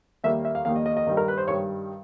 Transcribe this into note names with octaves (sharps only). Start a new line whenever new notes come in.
D#2 D#3 G3 A#3 E5
E5
F5
D#2 D#3 G3 A#3 F5
D#5
D#5
D#5
G2 D#3 G3
A#4
B4
C5
G2 D#3 G3 C#5